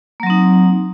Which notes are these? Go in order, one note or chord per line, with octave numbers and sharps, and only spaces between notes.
F#3 A#3 C4 D#4